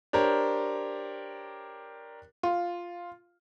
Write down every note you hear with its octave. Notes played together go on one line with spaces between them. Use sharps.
D4 G4 A#4 C5 C#5
F4